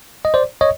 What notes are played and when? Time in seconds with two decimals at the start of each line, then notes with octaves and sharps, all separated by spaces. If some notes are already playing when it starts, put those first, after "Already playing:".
0.25 D#5
0.34 C5 D5
0.61 C#5 D#5